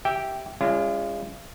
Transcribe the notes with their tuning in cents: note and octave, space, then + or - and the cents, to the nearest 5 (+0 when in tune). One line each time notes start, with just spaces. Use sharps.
G4 -10 E5 +0 G5 +0
G#3 -35 C#4 +20 F4 -40